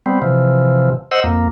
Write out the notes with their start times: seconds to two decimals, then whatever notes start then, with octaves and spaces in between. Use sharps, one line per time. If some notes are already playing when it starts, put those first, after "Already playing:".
0.06 G3 B3 C4
0.22 C3 E3 F3
1.11 C5 D#5 F#5 E6
1.24 F2 A#3